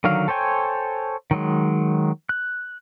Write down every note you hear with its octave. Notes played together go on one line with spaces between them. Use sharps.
D3 D#3 F#3 F5
A4 C5 C#5 G5 G#5
D#3 F#3 G#3
F#6